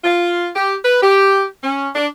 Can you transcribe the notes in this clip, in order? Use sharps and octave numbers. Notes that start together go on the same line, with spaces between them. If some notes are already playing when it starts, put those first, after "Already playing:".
F4
G4
B4
G4
C#4
D4